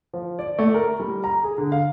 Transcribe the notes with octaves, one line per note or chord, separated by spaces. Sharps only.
F3
D5
A3
A#4
G3
A#5
G#4
D3
F5